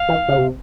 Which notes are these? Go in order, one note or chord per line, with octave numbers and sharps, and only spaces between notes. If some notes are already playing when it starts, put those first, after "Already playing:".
Already playing: F5
E3
C#3
C3